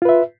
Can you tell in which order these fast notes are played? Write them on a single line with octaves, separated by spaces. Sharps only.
F4 B4 E5